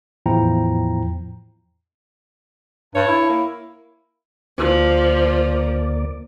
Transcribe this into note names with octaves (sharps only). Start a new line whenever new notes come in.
E2 A2 F3 E4 G5 A#5
G2 C#5
E4
A#3
D2 F3 A#3 D5